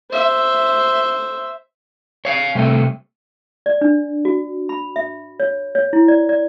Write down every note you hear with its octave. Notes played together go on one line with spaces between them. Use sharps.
C5 E5
C#5 F5
C3 G3 A3
D5
D4
F#4
B5
E5
C#5
C#5
E4
D5
D5